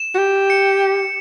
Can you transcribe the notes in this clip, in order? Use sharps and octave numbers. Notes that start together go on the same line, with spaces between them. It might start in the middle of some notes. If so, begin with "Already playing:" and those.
Already playing: E7
F#4
G4
C#7